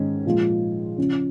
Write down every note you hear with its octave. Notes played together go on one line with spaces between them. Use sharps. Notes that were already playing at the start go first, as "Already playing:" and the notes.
Already playing: G#2 D#3 C#4
A#2 F3 G#3 F4
C#3 F3 C#4